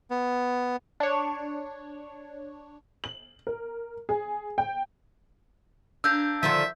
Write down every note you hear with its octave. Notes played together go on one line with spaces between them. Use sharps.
B3
D4 C#5
F#7
A#4
G#4
G5
A#3 D4 E6 G6
D3 D#3 F3 E5